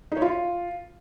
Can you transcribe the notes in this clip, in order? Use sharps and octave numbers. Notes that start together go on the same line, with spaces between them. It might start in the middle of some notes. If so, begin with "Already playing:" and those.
D#4
C#5
F4